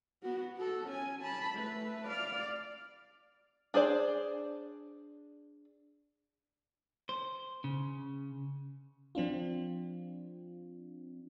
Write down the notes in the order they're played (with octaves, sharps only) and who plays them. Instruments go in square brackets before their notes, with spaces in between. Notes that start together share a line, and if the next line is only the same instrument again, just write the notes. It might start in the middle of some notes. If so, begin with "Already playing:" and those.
[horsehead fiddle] B3 F#4
F#4 A4
C#4 G#5
A5 B5
A3 B4
D5 F5
[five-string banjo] D4 G#4 C5 D5
[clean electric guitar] C5
C#3
[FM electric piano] F3 C4 D4 F4